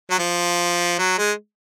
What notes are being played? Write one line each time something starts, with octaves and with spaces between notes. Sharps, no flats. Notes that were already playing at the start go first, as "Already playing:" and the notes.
F#3
F3
F#3
G#3